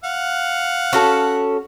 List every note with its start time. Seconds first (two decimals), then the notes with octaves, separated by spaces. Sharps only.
0.04 F5 F#5
0.93 C#4 F#4 A4